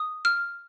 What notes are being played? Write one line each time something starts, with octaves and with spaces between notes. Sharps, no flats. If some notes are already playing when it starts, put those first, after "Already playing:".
Already playing: D#6
F6